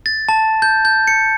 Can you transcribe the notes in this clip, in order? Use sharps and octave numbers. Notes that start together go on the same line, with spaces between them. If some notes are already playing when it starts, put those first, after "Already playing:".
A6
A5
G6
G6
C#7